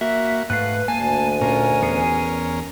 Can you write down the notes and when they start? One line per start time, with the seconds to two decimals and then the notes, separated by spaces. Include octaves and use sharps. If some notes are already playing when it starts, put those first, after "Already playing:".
0.01 A#3 F#4 E5
0.50 G#2 A3 B4 F5 F#5
0.88 D2 A#3 G#5 A5
1.41 A#2 C#4 F4 A#4
1.82 E2 B3 G#4